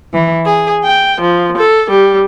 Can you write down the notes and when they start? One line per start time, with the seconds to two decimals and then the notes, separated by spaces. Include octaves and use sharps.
0.13 E3
0.44 G#4
0.84 G5
1.20 F3
1.57 A4
1.90 G3